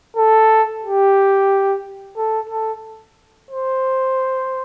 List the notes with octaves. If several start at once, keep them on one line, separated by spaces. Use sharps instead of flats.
A4
G4
A4
A4
C5